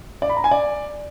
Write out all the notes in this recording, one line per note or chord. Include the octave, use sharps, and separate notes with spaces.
D5
B5
A#5
G#5
D5